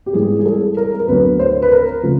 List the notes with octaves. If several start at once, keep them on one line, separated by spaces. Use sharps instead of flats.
G4
G#2 E3 G3 G#4
G#4
A4
A#4
A#4
D2 D3 F#3 B3 B4
C5
B4
A#4
C#3 F3 A3